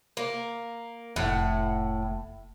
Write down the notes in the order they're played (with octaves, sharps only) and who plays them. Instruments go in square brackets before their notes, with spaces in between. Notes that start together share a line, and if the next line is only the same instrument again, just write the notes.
[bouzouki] A#3
[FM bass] F1 [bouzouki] A2 F#5